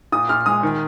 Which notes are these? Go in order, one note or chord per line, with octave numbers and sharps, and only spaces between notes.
A#2 D#6
A#2 F6
G#3 D#6
D#3